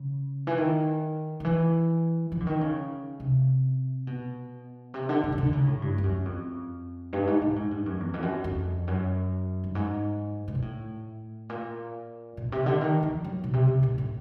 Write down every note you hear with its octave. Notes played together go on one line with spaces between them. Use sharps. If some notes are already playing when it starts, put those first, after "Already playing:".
Already playing: C#3
E3
D#3
D#3
E3
F3
D3
D#3
C#3
C3
B2
C3
D3
D3
C#3
D3
C#3
A2
G2
G2
F#2
F2
G2
G#2
A2
G#2
G2
F#2
E2
F2
F#2
F2
F#2
G2
G#2
B2
A#2
A2
A#2
A#2
C3
D3
D#3
F3
F#3
B2
C3
C3
A#2
A2